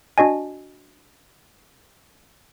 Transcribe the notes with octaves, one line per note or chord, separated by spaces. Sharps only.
D4 F#4 D#5 G#5